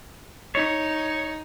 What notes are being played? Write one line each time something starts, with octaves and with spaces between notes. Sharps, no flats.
D#4 C#5